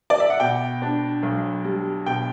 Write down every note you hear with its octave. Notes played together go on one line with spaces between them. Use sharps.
D5
E5
F#5
B2 G5
D4
B1
G3
B2 G5